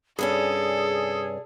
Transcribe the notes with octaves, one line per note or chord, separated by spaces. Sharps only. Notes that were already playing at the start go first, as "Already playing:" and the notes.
G2 C3 C#4 G#4 A4 D5